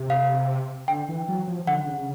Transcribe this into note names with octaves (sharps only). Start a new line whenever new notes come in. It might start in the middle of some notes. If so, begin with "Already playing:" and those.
Already playing: C3
F5
D3 G5
E3
F#3
F3
D3 F#5
C#3